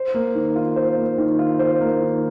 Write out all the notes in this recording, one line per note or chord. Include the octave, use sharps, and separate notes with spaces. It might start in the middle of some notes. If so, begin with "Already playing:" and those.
Already playing: C5
A#3
D#3
F4
C5
A#3
D#3
F4
C5
A#3
D#3